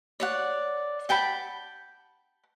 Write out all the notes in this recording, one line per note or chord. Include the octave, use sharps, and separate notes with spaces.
C#5 D5 F#5
F#5 G5 A5 B5